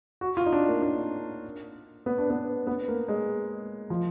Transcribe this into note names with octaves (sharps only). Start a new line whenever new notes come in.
F#4
F4
D#4
D4
A#3
D4
B3
D4
B3
B3
A#3
G#3
F3